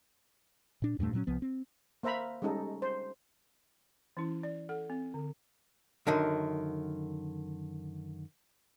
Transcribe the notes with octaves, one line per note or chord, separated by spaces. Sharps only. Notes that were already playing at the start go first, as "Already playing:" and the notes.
A#2 D4
E2 G2 A#2 A3
A#2 F#3 C4 C#4
C2 F3 B3
C4
A#3 C5 E5 A#5 B5
G3 G#3 C#4 D#4 A4
C5
E3 C#4 E4
D5
A4 F#5
C4
D3
F#2 D3 D#3